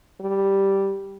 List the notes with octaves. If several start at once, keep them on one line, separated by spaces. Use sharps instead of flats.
G3